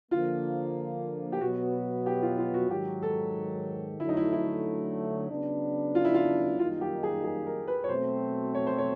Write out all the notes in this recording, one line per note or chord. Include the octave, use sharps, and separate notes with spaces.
D3 F3 A#3 F4
G4
B2 F#3 B3 F#4
G4
F4
F4
F#4
G#2 D#3 F#3 G4
A4
D3 F#3 A3 E4
D#4
E4
E4
C#3 F#3 B3 D4
F4
E4
F4
F#2 D#3 G3 A#3 D#4 F4
G4
G#4
G#4
A#4
B4
C#5
B2 F#3 A3 C4 C5
C#5
C5
C#5